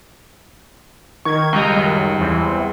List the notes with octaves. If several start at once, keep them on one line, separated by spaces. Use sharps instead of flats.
D#3 C#6 G#6
C#2 G3 D#5 A#5 G6
F#2 D#3
E2 E3 C4